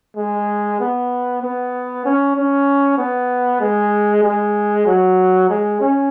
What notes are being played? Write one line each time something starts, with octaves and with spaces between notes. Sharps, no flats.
G#3
B3
B3
C#4
C#4
B3
G#3
G#3
F#3
G#3
C#4